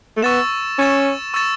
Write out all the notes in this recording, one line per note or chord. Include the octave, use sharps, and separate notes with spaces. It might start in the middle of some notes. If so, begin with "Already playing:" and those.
A3
B3 C#6 E6 A6 E7
C#4 C#6 E6 A6 E7
C#6 E6 A6 E7